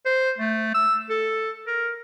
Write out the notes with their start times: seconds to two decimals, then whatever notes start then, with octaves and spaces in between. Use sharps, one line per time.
0.06 C5
0.38 A3
0.74 E6
1.10 A4
1.67 A#4